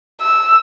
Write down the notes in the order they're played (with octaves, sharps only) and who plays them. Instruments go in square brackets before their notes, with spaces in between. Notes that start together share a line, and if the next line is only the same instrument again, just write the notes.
[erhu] E6